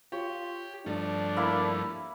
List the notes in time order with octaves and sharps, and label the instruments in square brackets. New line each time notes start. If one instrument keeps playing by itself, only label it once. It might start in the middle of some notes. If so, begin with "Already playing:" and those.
[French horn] F4 [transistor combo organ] G4 [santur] C#5
[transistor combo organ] G2 F3 A3 [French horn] D4
[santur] A#3 E4 B5